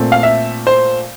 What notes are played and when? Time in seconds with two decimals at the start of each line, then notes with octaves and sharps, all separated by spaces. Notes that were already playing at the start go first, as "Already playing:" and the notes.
Already playing: A#2 A3 C4
0.12 F5
0.23 E5
0.67 C5